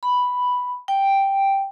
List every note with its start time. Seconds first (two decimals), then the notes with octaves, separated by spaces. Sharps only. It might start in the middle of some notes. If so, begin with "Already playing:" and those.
0.03 B5
0.88 G5